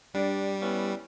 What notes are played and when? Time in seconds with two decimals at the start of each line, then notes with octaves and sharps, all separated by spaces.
0.14 G2 G3 D4
0.62 B3 C#4 E4